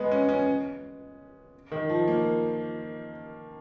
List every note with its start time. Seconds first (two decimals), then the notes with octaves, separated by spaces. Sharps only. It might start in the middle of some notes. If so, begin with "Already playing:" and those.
Already playing: G#3 B3
0.11 C#4
0.29 C#4
1.72 D#3
1.89 F3
2.08 A#3